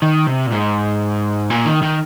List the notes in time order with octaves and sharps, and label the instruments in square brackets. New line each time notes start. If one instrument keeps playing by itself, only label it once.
[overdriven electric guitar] D#3
C3
A#2
G#2
A#2
D#3
D#3